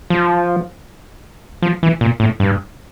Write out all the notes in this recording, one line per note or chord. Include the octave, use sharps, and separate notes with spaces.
F3
F3
E3
A#2
A2
G2